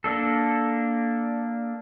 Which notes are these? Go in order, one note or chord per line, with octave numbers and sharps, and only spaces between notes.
A#3 D4 A4